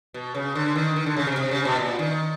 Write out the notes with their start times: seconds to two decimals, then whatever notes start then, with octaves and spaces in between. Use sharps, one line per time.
0.14 B2
0.35 C#3
0.55 D3
0.75 D#3
0.96 D#3
1.06 D3
1.16 C#3
1.27 C3
1.37 C3
1.51 C#3
1.65 B2
1.79 A#2
1.99 D#3